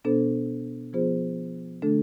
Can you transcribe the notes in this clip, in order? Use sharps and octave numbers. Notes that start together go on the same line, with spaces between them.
B2 B3 D4 A4 C5
F3 B3 F4 G#4 C5
D3 A3 D4 A4